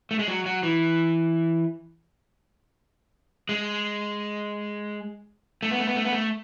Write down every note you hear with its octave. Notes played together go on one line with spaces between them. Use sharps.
A3
G#3
F#3
F#3
E3
G#3
A3
B3
A3
B3
A3
B3
A3